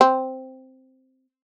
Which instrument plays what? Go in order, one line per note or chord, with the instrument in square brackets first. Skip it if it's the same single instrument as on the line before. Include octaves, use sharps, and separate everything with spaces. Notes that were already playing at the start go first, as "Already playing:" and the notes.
[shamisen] C4